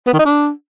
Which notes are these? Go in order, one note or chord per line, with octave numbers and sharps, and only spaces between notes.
B3
D#3
D#4
D4